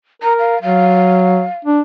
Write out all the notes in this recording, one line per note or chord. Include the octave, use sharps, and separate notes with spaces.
A#4 A#5
F5
F#3 F5
D4